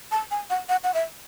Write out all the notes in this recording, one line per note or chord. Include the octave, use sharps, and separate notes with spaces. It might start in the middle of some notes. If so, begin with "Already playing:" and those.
A5
G#5
F#5
F#5
F#5
E5